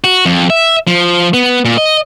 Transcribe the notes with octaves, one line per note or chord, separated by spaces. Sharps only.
F#4
F2
E5
F3
B3
A#2
D#5